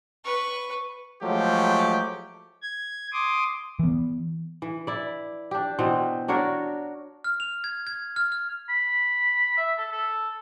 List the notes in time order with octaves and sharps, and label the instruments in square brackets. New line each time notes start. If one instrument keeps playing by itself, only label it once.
[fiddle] B4 C#6
[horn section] F3 F#3 G#3 A3 G4
[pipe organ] G#6
C6 D6 D#6
[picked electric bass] E3 B3
[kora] E3
E4 D5
D4 G4
B2 E3 C4
D4 F#4 A#4 C#5
[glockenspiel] F6
F7
G#6
G#6
F6
F6
[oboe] B5
E5
A4
A4